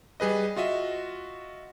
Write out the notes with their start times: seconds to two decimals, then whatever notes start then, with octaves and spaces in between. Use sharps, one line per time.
0.20 G3 G#4 B4 D#5
0.56 F4 F#4 D#5 E5